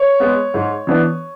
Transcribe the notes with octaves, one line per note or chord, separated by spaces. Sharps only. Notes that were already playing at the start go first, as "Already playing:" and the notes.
Already playing: C#5
G#3 B3
G#2
E3 B3 D4